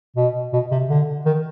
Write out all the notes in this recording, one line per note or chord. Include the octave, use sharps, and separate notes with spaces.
B2
B2
C3
D3
D#3